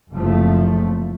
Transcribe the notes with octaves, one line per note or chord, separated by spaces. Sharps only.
F#1 C3 F3 A3